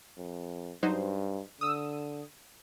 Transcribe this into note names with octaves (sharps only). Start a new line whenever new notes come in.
F2
G2 F#3 D#4 C5
D3 D#6 E6